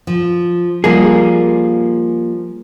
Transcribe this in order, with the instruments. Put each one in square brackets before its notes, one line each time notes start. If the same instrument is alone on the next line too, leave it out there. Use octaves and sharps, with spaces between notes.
[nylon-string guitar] F3
[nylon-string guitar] F3 G3 [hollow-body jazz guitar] A#3 G#4